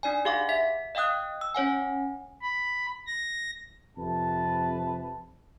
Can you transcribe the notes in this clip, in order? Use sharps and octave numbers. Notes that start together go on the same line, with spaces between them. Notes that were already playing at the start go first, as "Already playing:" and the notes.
D4 D#4 D5 G#5
G4 G#4 F5 F#5 D6
E5 B6
D#5 F5 G5 D#6 F#6
E6
C#4 C#5 F#5 G#5
B5
A#6
F2 C3 B4 A5